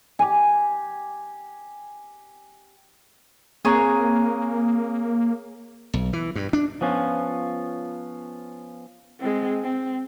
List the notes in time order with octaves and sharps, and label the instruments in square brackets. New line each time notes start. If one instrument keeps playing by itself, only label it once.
[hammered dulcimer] G4 G#5
[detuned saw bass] A#3 [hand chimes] C4 A#5 F#6 [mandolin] G#4 C#5
[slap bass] B1
E3
G2
D4
[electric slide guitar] F3 B3 C#4 F4
[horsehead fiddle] G#3 C4
C4